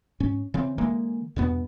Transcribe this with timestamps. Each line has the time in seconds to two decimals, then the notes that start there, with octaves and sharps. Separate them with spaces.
0.20 G#2 C#4
0.54 C#3 E3 C4
0.78 D3 E3 G#3 A#3
1.36 E2 G2 B2 B3